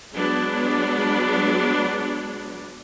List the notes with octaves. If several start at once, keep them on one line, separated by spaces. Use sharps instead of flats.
F#3 G#3 B3 D4